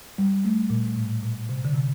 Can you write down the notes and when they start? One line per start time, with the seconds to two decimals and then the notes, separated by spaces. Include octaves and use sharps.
0.18 G3
0.45 A3
0.70 A#2
0.96 A2
1.23 A#2
1.49 C3
1.65 D3
1.74 C3